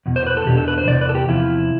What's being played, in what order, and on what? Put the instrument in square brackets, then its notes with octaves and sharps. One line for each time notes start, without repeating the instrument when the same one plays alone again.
[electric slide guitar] E2 B2
C5
B4
A4
E2 B2 D4 G4
A4
B4
C5
E2 C3 D5
B4
A4
G4
E2 C3 F3 E4